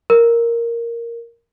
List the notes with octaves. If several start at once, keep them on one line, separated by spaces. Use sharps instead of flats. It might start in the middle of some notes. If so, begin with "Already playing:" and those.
A#4